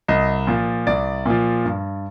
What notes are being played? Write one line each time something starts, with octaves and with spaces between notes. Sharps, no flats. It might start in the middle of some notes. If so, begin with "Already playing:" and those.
C2 D#5
A#2 F3
C2 D5
A#2 F3
G2